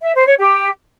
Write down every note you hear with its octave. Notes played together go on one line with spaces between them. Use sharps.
E5
C5
C#5
G4